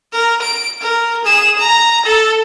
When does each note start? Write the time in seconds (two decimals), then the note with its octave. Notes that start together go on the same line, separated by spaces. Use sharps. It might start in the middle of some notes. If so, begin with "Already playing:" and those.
0.13 A#4
0.42 D7
0.82 A#4
1.25 G#4 E7
1.59 A#5
2.05 A4